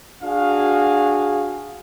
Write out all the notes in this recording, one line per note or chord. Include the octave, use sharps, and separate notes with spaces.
D4 F#4 G#4 F5